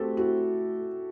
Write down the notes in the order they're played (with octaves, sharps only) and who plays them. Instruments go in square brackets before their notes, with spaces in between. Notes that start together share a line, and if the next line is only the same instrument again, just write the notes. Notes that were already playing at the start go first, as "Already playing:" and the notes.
Already playing: [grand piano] A3 C4 [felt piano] F#4 G4 A4
[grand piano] E4 [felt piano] F#4